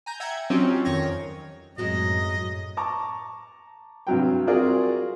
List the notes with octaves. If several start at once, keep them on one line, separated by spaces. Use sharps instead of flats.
G#5 A#5 G6
E5 F#5 G5 G#6
F#3 C4 C#4 D#4 F4 G4
F2 D#3 C#5 G#6 A#6
F#2 A2 F#3 G#3 C4 D#5
A5 A#5 C#6 D6
G2 C3 F#3 G5
C4 F4 F#4 G#4 A#4 D5